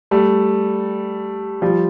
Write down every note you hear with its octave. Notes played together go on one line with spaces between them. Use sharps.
G3 A3
F3 G3